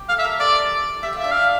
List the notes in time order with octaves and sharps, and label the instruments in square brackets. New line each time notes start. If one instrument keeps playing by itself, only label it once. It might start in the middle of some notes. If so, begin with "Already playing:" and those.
Already playing: [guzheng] G4
[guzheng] A4 [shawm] F5
[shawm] E5
[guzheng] A#4
[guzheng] A4 [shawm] D5
[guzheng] G4 [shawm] E5
[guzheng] F4
[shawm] E5
[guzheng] D4
[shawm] F5